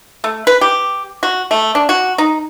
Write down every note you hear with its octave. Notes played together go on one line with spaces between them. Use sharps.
A3
B4
G4
F#4
A3
D4
F#4
D#4